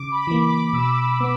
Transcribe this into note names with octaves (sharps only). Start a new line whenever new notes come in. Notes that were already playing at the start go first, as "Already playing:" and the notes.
Already playing: C#3 D6
B5
E3 A#3
D6
B2 E6
B3